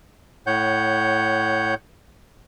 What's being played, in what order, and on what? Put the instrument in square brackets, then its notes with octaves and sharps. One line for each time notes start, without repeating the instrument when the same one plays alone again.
[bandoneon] A2 C#5 F#5 G6